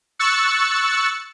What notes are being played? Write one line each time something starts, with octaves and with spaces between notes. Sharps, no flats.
C#6 E6 F#6 A6 C#7